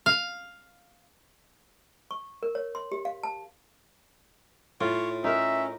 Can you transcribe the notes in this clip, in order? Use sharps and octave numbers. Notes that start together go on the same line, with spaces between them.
F5
C#6
A#4
C#5
C6
G4
F5
A5
A2 F4 C#5
C#4 D#4 A#4 E5